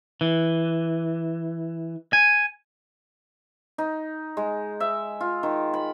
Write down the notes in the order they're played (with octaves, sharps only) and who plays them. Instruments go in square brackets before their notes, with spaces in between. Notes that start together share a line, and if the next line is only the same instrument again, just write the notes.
[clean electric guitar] E3
G#5
[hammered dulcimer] D#4
G#3
E5
F4
D#3
B5